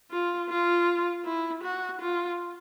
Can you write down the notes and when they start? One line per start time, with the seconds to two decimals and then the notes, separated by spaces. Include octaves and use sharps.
0.11 F4
0.50 F4
1.25 E4
1.63 F#4
2.01 F4